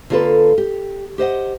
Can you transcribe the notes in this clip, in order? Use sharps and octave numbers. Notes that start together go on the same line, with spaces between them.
D3 A#3 F4 G4 A4 B4
G4
G4 C5 D#5 F#5